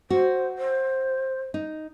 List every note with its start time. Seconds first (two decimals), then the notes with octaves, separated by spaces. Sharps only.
0.10 F#4 C5
0.58 C5
1.54 D#4